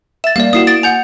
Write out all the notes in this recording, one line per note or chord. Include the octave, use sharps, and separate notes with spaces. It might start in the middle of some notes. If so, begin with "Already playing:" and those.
E5 A6 E7
G3 A#3 D5 F5
A#3 E4 F#4 D#6 C7 E7
D#6 A6 D7
F#5 G#5 G6 F7